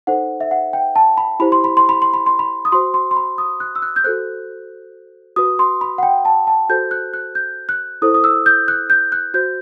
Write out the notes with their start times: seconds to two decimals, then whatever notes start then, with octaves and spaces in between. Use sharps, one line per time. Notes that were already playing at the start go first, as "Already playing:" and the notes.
0.07 D#4 A4 C5 F#5
0.41 E5
0.51 F#5
0.73 G5
0.96 A5
1.17 B5
1.40 E4 G4 C5 B5
1.52 C6
1.64 B5
1.77 C6
1.89 B5
2.02 C6
2.14 B5
2.26 C6
2.39 B5
2.65 D#6
2.72 F#4 C5 C6
2.94 C6
3.11 C6
3.16 B5
3.38 D#6
3.60 F#6
3.76 E6
3.82 F#6
3.96 G6
4.04 F#4 A4 C5 F#6
5.36 F#4 B4 D#6
5.59 C6
5.81 B5
5.98 F#5
6.03 G5
6.25 A5
6.47 A5
6.69 F#4 A4 C5 G6
6.91 F#6
7.14 F#6
7.35 G6
7.69 F#6
8.02 E4 A4 C5 D#6
8.14 D#6
8.24 E6
8.46 G6
8.68 F#6
8.90 G6
9.12 F#6
9.34 F#4 C5 G6